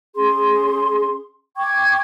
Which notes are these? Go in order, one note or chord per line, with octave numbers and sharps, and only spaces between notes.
C#4 G#4 C6
G5 C#6 D6 G#6